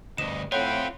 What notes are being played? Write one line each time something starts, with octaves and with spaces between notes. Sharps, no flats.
D2 G2 D#5 E7
A2 C4 F4 C#5 F#5 G5 B5